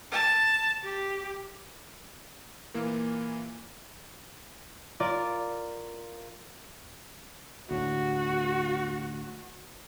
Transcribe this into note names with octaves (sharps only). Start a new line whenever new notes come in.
A5
G4
A#2 E3 A#3
F4 A#4 D5
D2 A2 D3 F#4